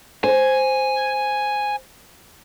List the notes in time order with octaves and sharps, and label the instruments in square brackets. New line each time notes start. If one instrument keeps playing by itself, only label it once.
[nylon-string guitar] C5 [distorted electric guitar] G#5